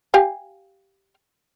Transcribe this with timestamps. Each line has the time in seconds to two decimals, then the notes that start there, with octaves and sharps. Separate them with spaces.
0.14 G4 F5 G#5